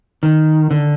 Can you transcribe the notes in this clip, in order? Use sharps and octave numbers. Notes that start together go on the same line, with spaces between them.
D#3
D3